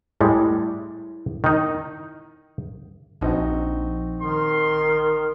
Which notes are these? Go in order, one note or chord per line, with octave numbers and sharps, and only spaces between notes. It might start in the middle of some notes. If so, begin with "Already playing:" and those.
A2 G3 G#3 E4
D#3 D#4
A#1 C4 D#4 F#4
D#3 C6